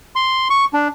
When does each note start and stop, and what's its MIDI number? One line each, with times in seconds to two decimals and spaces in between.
0.15 0.48 84
0.50 0.65 85
0.73 0.88 62